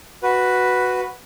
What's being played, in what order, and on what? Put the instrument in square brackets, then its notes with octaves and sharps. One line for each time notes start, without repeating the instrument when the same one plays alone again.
[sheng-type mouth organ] F#4 B4